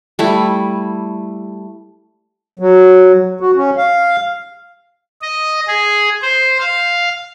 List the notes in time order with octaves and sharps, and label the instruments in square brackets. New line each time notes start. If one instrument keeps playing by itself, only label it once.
[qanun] G3 A3 E4
[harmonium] F#3
F#4
C#4
F5
[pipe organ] D#5
G#4
C5
F5